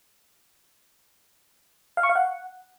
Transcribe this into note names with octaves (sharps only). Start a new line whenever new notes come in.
F5
C#6
F5
F#5